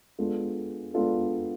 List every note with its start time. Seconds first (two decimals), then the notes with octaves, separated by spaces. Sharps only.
0.18 G#3 B3 D4 F4 A4
0.94 G#3 B3 D4 F4 A4